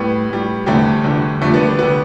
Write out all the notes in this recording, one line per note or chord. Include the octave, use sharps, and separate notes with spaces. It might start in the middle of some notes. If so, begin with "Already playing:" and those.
Already playing: A2 G3 B3
A2 G3
E2 D3 G3 A3 C4
E2 D3 G3
F2 D3 G3 A3 C4
B3 D4
B3 D4
D3 G3 B3